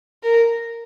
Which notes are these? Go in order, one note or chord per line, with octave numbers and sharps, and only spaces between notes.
A#4